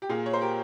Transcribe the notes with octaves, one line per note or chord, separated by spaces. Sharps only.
G4
A#2 F4 G#4
C#5
C5
G4 A#4